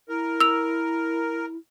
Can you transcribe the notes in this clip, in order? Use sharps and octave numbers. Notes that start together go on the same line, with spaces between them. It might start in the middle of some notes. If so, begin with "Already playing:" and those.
E4 A#4
E6 F7